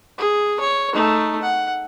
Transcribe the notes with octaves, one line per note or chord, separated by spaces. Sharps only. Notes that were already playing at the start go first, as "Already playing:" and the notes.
G#4
C#5
A3 D#4
F#5